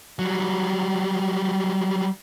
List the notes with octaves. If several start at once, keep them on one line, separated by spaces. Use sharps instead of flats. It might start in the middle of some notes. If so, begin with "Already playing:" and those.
F#3 G3